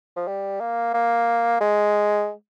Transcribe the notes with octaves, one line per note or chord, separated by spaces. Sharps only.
F3
G3
A#3
A#3
G#3